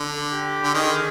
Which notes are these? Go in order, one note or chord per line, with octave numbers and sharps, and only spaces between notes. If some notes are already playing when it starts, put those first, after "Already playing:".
Already playing: D3
G4
D3
D#3 G#4